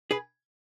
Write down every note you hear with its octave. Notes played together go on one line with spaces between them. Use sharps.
G#4 B4